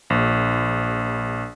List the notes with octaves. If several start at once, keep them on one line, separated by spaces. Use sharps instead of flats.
A#1